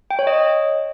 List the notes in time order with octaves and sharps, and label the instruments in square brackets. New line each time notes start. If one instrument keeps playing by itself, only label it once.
[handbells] G5
C#5
D#5